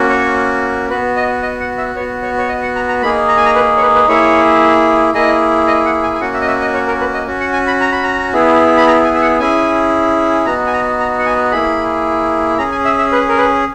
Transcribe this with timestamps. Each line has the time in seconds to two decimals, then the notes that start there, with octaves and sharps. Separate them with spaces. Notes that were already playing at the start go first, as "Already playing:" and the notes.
Already playing: A#3 C#4 F#4
0.10 C#5
0.89 B3 F#4 B4
1.16 D#5
1.42 D#5
1.60 F#5
1.78 E5
1.95 B3 C#5
2.00 F#4
2.22 C#5
2.38 C#5
2.49 D#5
2.62 F#5
2.75 A#5
2.89 A#5
3.02 A#3 D#4 G#4 B5
3.28 A#5
3.37 G#5
3.46 A#5
3.55 B4
3.77 C#5
3.81 B4
3.95 B4
4.08 A#3 E4 G#4 C#5
5.14 A#3 E4 G#4 D#5
5.67 D#5
5.85 F#5
6.03 G#5
6.15 G#5
6.21 A#3 C#4 F#4 F#5
6.34 E5
6.41 D#5
6.47 E5
6.61 D#5
6.74 C#5
6.87 A#4
7.00 B4
7.14 D#5
7.27 C#4 F#4
7.40 F#5
7.53 G#5
7.67 B5
7.80 A#5
7.92 B5
8.03 A#5
8.33 B3 E4 G#4
8.77 B5
8.87 A#5
9.04 G#5
9.14 E5
9.22 F#5
9.39 C#4 E4 G#4 G#5
10.46 B3 D#4 F#4 A#5
10.67 G#5
10.73 A#5
10.99 A#5
11.19 F#5
11.26 G#5
11.52 A#3 E4 G#4 B5
12.58 C#4 G#4 A#5
12.72 G#5
12.85 E5
12.98 E5
13.12 B4
13.28 A#4
13.38 B4